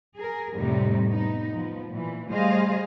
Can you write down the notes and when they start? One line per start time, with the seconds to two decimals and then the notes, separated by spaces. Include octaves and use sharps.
0.16 G#4 A#4
0.55 F2 A2 C3 G3 A3 D#4
1.07 B3 D#4
1.53 F3 B3
1.89 A#2 E3
2.31 G3 A3 G#4 C5 D#5 F5